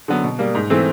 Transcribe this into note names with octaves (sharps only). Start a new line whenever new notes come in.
D3 F#3 B3
B2
G3 A#3
G#2
E3 A3 C4